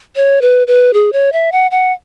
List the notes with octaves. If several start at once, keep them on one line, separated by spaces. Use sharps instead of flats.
C#5
B4
B4
G#4
C#5
E5
F#5
F#5